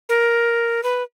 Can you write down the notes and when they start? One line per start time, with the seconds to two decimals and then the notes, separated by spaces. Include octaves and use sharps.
0.09 A#4
0.83 B4